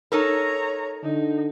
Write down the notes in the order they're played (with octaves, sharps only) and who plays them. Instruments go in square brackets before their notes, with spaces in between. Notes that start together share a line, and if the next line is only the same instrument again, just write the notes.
[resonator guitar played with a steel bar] D#4 A4 A#4 [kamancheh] C#5 A#5
[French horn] D3 [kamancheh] D#4